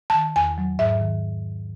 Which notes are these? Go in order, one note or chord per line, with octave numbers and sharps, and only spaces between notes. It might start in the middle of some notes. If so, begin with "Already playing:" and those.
D#3 A5
E2 G#5
F#3
G#2 E5
D#3